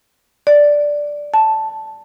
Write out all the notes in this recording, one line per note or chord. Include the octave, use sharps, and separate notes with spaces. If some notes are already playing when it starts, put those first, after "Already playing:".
D5
A5